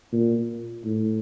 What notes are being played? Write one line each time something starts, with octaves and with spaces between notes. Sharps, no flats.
A#2
A2